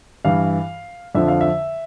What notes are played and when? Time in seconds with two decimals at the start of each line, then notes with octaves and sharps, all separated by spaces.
0.25 G2 E3 F5
1.15 F2 D3 F3 E5
1.28 F5
1.41 E5